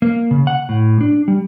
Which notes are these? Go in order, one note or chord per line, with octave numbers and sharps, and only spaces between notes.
A#3
C#3
F#5
A2
D4
G3